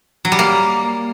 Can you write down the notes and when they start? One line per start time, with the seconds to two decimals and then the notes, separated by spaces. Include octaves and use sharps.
0.25 F#3
0.32 G3
0.39 A#3